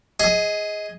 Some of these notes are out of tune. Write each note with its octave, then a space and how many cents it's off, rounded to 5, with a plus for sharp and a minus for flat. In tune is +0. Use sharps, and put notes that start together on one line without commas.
G#4 +0 D#5 +20